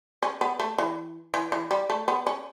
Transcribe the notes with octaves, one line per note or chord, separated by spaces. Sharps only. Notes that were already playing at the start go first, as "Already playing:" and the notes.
C#4
B3
A3
E3
E3
E3
G3
A3
B3
C#4